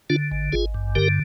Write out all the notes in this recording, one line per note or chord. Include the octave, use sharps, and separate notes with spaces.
D3 D4 F4
G#1
G#1 F4 G#4
G2
D3 G4 A#4